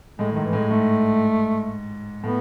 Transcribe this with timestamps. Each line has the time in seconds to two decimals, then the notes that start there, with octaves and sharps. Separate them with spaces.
0.19 A2 G#3
0.32 D#3
0.36 G#2
0.45 E3
0.53 A2 G#3
0.71 G#2 A3
2.23 A2 B3